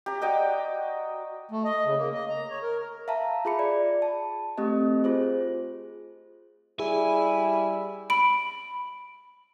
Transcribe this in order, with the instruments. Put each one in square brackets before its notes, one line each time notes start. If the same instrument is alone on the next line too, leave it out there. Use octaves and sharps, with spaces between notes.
[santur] G4 A#5
F#4 D5 D#5 G5
[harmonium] A3
D#5
C#3
A#3
D#5
A#5
C#5
A#4
[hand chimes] E5 F5 A5 A#5
F4 G#4 B5 C#7
D5
A5
A3 C4 G4 D#5
F4 G#4 C5
[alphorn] G3 [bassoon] E4 [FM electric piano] G#4 [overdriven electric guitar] G#5
[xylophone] B5 D7